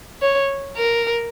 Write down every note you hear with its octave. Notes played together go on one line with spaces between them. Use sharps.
C#5
A#4